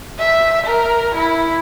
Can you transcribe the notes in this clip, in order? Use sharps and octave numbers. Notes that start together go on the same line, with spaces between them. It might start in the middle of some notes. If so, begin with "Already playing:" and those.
E5
A#4
E4